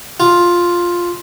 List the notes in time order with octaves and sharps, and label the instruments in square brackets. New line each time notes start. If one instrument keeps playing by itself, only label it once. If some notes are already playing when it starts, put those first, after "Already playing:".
[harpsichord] F4